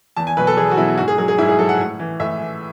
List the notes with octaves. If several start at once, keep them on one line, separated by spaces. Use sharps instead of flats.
E2 A5
G#5
B2 F#3 B4
A4
E2 G#4
F#4
B2 F#3 E4
G#2 F#4
G#4
F#3 G#4
G#4
G#2 E4
G#4
F#3 A4
F#5
A2
E3
A2 E5
E3